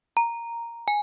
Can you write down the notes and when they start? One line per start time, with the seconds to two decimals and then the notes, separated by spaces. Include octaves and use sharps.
0.17 A#5
0.88 G#5